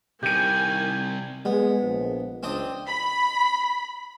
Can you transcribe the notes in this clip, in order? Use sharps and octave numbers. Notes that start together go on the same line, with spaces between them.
C3 D#3 G3 G4 G#5 G6 D7
G#3 B3
A#1
C#2 C4 D4 D#5
B5